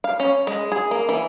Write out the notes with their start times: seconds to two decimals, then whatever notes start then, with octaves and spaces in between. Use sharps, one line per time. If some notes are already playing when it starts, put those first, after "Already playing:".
0.04 F5
0.20 C#4
0.47 G#3
0.72 G#4
0.91 A#3
1.09 E3